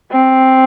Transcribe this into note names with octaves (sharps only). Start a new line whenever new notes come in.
C4